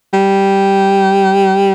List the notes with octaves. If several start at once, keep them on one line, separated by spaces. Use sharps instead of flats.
G3